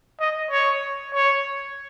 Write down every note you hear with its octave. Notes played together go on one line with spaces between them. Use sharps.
D#5
C#5
C#5